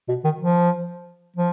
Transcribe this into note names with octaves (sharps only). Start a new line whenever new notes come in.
B2
D#3
F3
F3